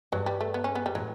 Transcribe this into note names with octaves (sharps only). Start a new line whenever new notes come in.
G2 F#3
G3
A3
B3
C#4
B3
G3
A2 F#3